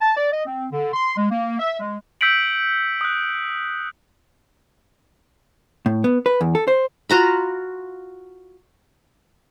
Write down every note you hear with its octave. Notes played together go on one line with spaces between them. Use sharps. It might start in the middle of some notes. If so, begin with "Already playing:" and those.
A5
D5
D#5
C4
D3
C6
G#3
A#3
E5
G#3
E6 G6 B6 C#7 D7 F#7
D#6 F#6
A2
B3
B4
E2
A4
C5
F4 F#4 A#5 B5